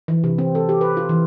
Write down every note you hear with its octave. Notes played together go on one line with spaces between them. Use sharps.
E3
C3
C4
A4
G4
B4
F4
E3